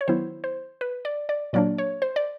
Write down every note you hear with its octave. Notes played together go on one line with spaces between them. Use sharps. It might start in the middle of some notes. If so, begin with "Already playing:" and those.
C#5
D#3 F#3 B3 E4 C5
C5
B4
D5
D5
A#2 F#3 A#3 D4 D5
C#5
C5
D5